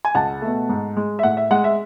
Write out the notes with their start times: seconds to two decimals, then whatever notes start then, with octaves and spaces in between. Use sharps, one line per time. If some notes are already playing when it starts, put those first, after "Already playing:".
0.05 G#5
0.15 C#2 F#5 A5
0.42 B2 A3
0.69 G#2
0.96 G#3
1.19 E5
1.23 A2 F#5
1.37 E5
1.51 G#3 F#5
1.64 E5